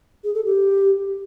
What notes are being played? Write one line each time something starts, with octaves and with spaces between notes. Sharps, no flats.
G#4
A4
G4